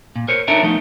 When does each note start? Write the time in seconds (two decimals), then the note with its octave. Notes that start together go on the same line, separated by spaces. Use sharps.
0.16 A#2
0.28 A#4 C5 C#5
0.48 D4 D#4 A4 A#4 C#5 E5
0.63 F3 A3 B3 D#4